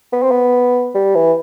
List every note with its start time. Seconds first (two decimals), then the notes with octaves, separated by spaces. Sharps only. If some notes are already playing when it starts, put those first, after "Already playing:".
0.13 B3
0.23 C4
0.31 B3
0.95 G3
1.15 E3